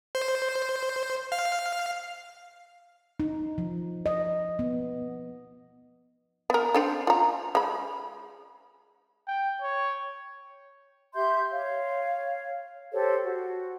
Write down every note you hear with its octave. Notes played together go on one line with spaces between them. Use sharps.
C5
F5
D#4
F3
D#5
B3
B3 A#4
C4 D4 A4
F4 A#5
G#3 B5
G5
C#5
G4 E5 C6 G6
C#5 F5
G4 A4 C5 C#5
F#4